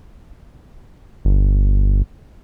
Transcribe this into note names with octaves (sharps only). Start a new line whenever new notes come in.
G1